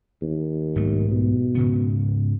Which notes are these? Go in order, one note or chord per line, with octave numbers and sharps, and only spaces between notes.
D#2
B1 G#2 A3
B2
G#2 C#3 B3